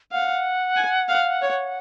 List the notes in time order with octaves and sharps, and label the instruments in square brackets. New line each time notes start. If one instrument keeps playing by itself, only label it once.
[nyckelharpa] F5 [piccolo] F#5
[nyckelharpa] G#5
F5
C#5